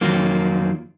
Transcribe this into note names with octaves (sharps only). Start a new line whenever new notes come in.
F2 D#3 F#3 A#3 F4